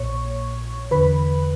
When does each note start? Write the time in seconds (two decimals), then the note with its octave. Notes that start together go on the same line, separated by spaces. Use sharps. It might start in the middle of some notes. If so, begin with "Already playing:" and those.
Already playing: A#1 A#2 C#5 C#6
0.91 E2 D3 B4 B5